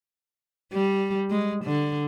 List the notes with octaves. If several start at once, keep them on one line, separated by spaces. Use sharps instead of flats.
G3
G#3
D3